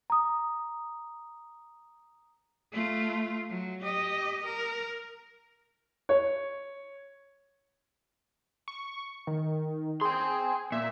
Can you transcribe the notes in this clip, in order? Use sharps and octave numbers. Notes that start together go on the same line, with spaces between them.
A#5 D#6
A3 F4
F#3
G4 D#5
A#4
C#5
C#6
D#3
G#4 G5 C6
A#2 E5